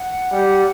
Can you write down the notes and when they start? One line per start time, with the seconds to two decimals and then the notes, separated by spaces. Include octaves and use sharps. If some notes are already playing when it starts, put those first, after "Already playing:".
Already playing: F#5
0.32 G3